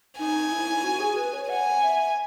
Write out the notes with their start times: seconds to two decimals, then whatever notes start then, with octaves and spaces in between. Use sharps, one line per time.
0.19 D#4 G#5
0.51 E4
0.84 F#4
1.00 G#4
1.16 B4
1.33 C#5
1.49 F#5 G#5
1.82 E5